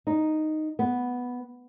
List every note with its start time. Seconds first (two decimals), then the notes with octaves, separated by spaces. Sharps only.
0.07 D#4
0.79 B3